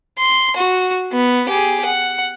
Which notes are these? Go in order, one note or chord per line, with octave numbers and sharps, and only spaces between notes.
C6
F#4
B3
G4 G#4
F#5